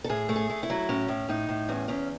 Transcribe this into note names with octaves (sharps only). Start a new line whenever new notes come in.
A4
A2 G#4
A3
G#4
A3
E4
F#3
A2 C#4
A2
A2 D#4
A2
E2 C#4
E2 C#4